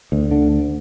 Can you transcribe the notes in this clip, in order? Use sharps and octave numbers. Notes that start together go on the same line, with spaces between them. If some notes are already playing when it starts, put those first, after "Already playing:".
D2
D3